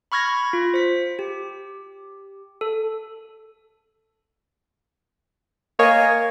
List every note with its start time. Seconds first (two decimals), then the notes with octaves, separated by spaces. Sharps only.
0.12 B5 C#6 F6 G#6 A#6
0.53 F4
0.74 C5 B6
1.19 G4
2.61 A4
5.79 A#3 C#5 D#5 G#5